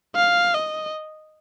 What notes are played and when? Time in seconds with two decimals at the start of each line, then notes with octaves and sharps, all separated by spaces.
0.16 F5
0.54 D#5